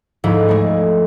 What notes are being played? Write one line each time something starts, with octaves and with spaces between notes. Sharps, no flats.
D2 G#2 F3 E4
G#3 A3